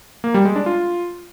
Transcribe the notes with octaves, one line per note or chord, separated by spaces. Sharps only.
A#3
G3
G#3
D4
F4